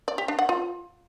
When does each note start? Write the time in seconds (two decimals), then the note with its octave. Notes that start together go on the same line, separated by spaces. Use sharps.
0.08 D5
0.18 G4
0.28 D4
0.39 F#5
0.49 F4